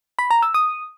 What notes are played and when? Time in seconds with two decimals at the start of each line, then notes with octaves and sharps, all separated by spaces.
0.19 B5
0.31 A#5
0.42 E6
0.54 D#6